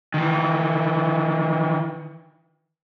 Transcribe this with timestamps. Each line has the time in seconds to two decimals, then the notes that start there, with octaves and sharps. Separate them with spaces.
0.14 D#3 E3